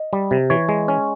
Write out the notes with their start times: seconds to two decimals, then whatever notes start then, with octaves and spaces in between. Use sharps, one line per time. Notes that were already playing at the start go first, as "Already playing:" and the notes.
Already playing: D#5
0.13 G3
0.31 C3
0.50 E3 C#5
0.69 G#3
0.88 C#4